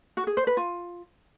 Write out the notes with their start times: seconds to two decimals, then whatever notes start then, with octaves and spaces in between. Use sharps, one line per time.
0.17 F#4
0.27 G#4
0.37 C5
0.47 B4
0.57 F4